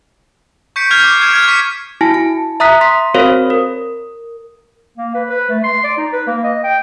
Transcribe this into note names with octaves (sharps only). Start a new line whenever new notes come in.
C#6 G6 B6 C#7 D7
F6 G6 G#6 B6 C7 F7
D6 F6 C7
D6 F6 G6 G#6 D7 E7
F6 G#6
C#6 B6 C#7 D#7
E4 F#4 G#5 A5
A5
E5 A#5 D#6 F#6 B6
C6 B6
C4 F#4 A#4 C5 C#5 F5
A#4
A#3
B4
B4
A3
C6
D5
D#4
B4
A#3
D#5
G5